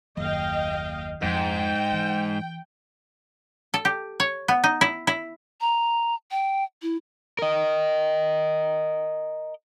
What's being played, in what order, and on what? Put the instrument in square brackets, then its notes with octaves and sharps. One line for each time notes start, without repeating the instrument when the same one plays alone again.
[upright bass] F#1 D#2 [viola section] D#5 F5 G5
[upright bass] F2 F3 [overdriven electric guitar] G#2 [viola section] G5
[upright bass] E3
[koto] A4
G4
C#5
B3
D#4
E4
E4
[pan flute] A#5
G5
E4
[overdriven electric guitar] A#4 D#5